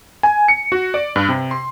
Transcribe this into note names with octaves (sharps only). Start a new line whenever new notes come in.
G#5
C#7
F#4
D5
G2
C3
C6